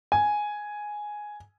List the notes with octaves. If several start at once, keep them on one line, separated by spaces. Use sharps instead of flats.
G#5